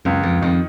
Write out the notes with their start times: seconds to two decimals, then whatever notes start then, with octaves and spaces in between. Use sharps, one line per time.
0.05 C#2 F#2
0.23 F2
0.42 F2 D#3